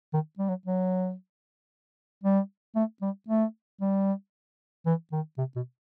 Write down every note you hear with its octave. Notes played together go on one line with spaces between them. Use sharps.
D#3
G3
F#3
F#3
G3
A3
G3
A3
G3
E3
D#3
C3
B2